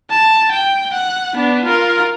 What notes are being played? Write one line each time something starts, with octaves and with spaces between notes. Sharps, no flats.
A5
G5
F#5
B3 D4
F4 A#4